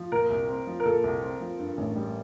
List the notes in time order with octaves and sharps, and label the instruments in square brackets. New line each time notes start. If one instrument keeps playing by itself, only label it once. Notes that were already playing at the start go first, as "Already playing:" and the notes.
Already playing: [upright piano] F3
[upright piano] A#2 [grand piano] A#4
[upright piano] C2
C4
F3
[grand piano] A#4
[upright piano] A#2 [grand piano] A4
[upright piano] C2
C4
F3
G2
A1
G3